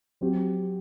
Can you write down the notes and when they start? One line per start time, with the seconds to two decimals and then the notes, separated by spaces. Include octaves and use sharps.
0.21 F#3 C4 G4